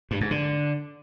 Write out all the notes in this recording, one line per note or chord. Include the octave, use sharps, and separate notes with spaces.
G2
G#2
D3